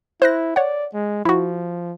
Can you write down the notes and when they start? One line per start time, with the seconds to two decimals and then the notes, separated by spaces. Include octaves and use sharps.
0.22 E4 C5 F#6 A#6
0.56 C#5 D5 F#5
0.94 G#3
1.25 F3 E4 F#4